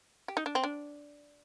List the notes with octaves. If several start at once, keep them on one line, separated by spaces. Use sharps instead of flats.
G4
D#4
D4
C4
D4